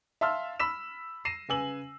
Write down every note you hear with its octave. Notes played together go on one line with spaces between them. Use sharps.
E5 F5 A5 C6 E6 F6
B5 E6 B6 E7
A#6 C7 D#7 E7
C#3 B4 G#5 E6 F#7